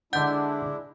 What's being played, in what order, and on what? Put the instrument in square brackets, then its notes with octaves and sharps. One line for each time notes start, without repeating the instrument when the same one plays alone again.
[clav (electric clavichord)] D3 D5 [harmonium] G#3 D4 E4 [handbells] F#5 G6